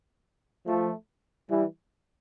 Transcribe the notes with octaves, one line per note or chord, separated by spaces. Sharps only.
F3 A3
E3 G3